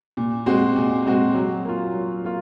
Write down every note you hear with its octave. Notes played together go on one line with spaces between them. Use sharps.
A#2
G#3 C4 F#4
A#2
G#3 C4 F#4
F#3
A#3 F4
F#3
A#3 F4